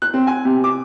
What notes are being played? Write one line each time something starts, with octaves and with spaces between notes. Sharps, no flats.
F#6
C4
G#5
C3
D6